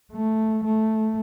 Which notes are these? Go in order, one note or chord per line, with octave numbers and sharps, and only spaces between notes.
A3
A3